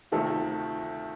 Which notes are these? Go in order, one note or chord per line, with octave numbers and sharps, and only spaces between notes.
D2 C3 D#3 F4 A4